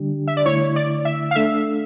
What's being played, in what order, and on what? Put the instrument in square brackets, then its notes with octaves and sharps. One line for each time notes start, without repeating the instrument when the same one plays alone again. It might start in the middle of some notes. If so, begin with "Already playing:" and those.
Already playing: [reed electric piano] D3 G3 D4 G4
[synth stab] E5
D5
[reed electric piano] D3 A3 E4 [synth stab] C#5
[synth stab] D5
E5
F5
[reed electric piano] A3 D4 A4 [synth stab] E5